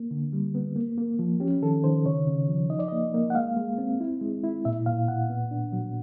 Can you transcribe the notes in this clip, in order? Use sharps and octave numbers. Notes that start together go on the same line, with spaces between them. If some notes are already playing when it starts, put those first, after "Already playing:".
Already playing: A#3
D3
G3
B3
A#3
A#3
F3
C#4 G4
D#3 A4
D#3 C5
C#3 C#5
C#3
F3
D#4 D#5
D5
A#3 D#5
A#3
F#5
G#3 F5
G#3
C4
E4
G#3
E4
A#2 E5
A#2 F5
A#2 F#5
B3
D4
F#3